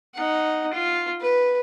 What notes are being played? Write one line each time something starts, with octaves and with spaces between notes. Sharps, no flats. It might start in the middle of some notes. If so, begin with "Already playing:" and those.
D#4 F#5
F4
B4